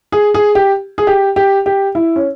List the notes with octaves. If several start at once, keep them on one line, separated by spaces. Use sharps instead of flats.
G#4
G#4
G4
G#4
G4
G4
G4
E4
C#4